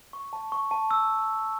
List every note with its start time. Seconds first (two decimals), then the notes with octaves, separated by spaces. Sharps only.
0.13 C#6
0.33 A5
0.52 C#6
0.71 A5
0.91 E6